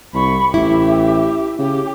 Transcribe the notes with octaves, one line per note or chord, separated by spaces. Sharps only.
C2 B5 C#6
A1 E4 G4 E5
C#3 G4